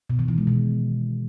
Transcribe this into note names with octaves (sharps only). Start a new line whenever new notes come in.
B2
D#3
E3
G#3
B2